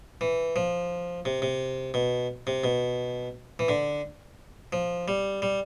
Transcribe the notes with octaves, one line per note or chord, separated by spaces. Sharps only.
E3
F3
C3
C3
B2
C3
B2
E3
D3
F3
G3
G3